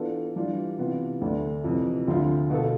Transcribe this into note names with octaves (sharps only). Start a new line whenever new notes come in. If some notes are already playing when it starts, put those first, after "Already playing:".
Already playing: E3 B3 D4 F4 A4
E3 G3 D4 F4
C3 E3 B3 F4
D2 D3 A3 D4
F2 C3 E3
D2 D3 F3 C4 F4
B2 B3 F4 A4